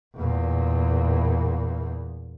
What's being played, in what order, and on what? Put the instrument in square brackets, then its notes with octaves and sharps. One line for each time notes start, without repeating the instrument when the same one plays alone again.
[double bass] E2 A#2